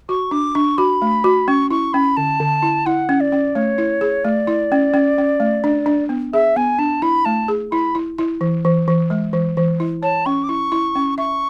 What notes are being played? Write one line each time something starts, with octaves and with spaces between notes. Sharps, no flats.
F#4 C#6
D4 D6
D4 C#6
F#4 B5
A3
F#4
C#4 C#6
E4 C#6
C#4 B5
D3 A5
D3
E4
E4 F#5
C#4
D5
C#4
A3 C#5
E4
G#4
A3 D5
E4
C#4
C#4
C#4
A3
D4
D4
B3
G#4 E5
B3 G#5
D4 A5
E4 B5
A3 A5
G#4
E4 B5
E4
E4
E3
E3
E3
G#3
E3
E3
E4
C#5 A5
C#4 C#6
D6
E4 C#6
E4
C#4
E5 C#6